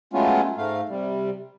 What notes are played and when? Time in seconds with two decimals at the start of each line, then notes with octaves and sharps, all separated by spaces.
0.13 F#3 G#3 A3 B3 C#4 F4
0.57 G#2 A3 F5
0.89 C3 G3